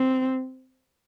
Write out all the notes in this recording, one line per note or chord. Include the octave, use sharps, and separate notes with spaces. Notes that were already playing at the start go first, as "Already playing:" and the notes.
Already playing: C4